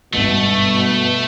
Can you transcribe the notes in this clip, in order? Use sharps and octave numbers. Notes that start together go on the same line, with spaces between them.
G#1 G2 B2 A3